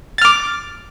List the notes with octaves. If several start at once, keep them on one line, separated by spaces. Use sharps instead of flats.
D6 F6 A6